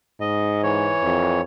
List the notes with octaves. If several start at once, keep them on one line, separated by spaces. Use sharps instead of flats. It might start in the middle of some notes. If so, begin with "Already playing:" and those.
G#2 D#5
E3 C#5
F2